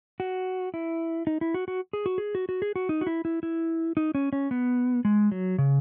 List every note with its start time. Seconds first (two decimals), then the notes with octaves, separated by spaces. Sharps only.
0.20 F#4
0.74 E4
1.27 D#4
1.41 E4
1.54 F#4
1.68 F#4
1.93 G#4
2.06 F#4
2.18 G#4
2.35 F#4
2.49 F#4
2.62 G#4
2.76 F#4
2.89 D#4
3.01 F#4
3.07 E4
3.25 E4
3.43 E4
3.97 D#4
4.15 C#4
4.33 C#4
4.51 B3
5.05 G#3
5.32 F#3
5.58 C#3